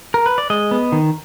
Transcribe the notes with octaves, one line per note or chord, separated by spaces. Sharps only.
A#4
B4
D5
G#3 D#5
B3
D#3